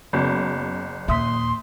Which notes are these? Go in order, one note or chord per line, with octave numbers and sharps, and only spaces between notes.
F#1 C#3 F#3 B3
D#2 A#2 E5 C6 D#6 B6